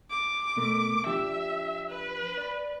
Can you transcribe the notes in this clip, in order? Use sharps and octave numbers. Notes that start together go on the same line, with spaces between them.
D6
B2 A3 A#4
F3 D4 G4 E5
B4
D5 B5